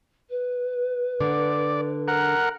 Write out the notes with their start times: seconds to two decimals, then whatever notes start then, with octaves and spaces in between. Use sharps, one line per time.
0.29 B4
1.20 D3 D5
2.08 A#4 F#5